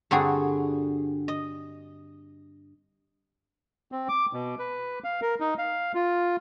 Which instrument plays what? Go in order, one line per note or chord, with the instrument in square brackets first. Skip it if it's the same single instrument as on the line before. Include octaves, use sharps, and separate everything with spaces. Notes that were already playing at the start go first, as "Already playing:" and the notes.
[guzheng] G2 D3 C4 F#4 G#4
D#5
[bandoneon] C4
D6
B2
B4
F5
A#4
D#4
F5
F4